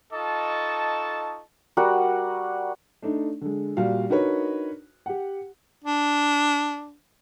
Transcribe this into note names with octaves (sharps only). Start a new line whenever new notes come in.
D#4 F4 A4 D#5 A5 C#6
G3 F#4 A#4 F#5
A3 D4 D#4
D3 G#3
A#2 G3 F#4 F5
D4 D#4 F#4 A#4 B4 C#5
G4 F#5
D4